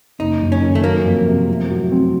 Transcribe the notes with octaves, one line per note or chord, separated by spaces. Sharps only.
F#1 D#4
F#2
C#4
D#3
A3
F#3 A#3
F2
C3
A2
F#3
C4